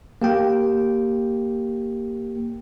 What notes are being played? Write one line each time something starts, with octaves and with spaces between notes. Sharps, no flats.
A#3 G4 G5